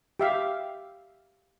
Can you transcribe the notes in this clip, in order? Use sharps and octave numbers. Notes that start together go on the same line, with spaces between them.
G4 E5 F5